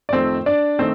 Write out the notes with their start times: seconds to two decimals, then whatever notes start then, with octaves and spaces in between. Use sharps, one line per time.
0.09 D5
0.13 F2 D#3 A3 C4 C5
0.46 D4 D5
0.79 D#3 A3 C4 C5